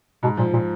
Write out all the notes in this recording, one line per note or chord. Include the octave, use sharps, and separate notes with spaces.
G#2 B2
A#2 F3
A#2